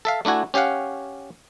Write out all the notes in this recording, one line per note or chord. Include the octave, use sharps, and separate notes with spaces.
A4 E5 F5
A3 D4 E4 F#4 G#5
C#4 G4 C#5 F5 F#5